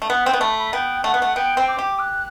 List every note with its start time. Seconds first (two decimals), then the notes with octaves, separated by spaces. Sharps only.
0.02 A3
0.10 B3 F#5
0.26 C4 G5
0.33 B3
0.41 A3 B5
0.58 B5
0.73 B3 G5
1.04 A3 F#5
1.14 B3
1.22 A3
1.36 B3 G5
1.57 C4
1.68 D6
1.79 G4
1.99 F#6